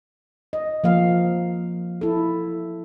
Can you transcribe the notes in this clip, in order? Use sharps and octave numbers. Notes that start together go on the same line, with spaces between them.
D#5
F3 A#3 F5
E4 A4